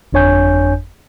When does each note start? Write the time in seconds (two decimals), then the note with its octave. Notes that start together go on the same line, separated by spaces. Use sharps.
0.13 G1 F2 D4 C#5 G#5 G6